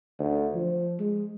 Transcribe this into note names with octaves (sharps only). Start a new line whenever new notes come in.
D2
F3
G#3